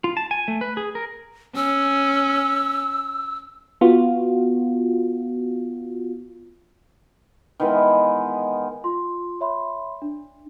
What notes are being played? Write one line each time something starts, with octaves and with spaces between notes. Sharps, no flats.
F4
A5
G#5
A3
B4
G#4
A#4
C#4 E6
B3 F4 F#4
D#3 E3 G#3 B3
F4 C6
C#5 E5 B5 C6
D4